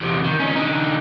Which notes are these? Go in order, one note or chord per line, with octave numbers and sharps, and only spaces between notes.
E2 C3
D#3
C#4 D#4
D3 D#4